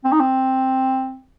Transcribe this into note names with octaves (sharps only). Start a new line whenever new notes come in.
C4
D#4
C4